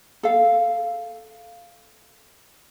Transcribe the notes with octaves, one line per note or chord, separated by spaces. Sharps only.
A4 F5